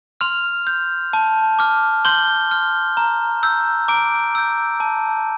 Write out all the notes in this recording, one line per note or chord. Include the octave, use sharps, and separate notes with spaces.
C6 F6 F7
G6
A5
D6 F6
C6 G6 G7
F6
A#5
E6 G6
A#5 D6 D7
E6 G6
A5